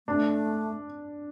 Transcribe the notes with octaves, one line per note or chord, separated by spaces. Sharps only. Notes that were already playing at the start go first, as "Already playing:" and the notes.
A3 D4